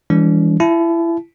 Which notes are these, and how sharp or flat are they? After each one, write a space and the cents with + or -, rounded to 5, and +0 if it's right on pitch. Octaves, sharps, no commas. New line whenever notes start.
E3 +0 G3 +45 D4 -45
E4 +25 A5 -30